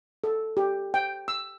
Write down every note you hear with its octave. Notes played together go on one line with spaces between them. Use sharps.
A4
G4
G5
E6